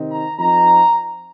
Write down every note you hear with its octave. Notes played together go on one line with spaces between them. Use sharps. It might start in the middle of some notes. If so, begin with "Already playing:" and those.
Already playing: C3 D#3 C4 D#4
A#5
F2 F3 C4 D#4 A#5